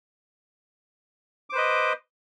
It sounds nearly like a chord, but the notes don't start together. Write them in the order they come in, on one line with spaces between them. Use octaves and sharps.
D6 C5 B4 D#5